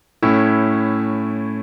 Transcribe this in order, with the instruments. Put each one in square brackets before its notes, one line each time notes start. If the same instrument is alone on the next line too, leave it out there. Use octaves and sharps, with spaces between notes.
[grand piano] A2 A3 C#4 E4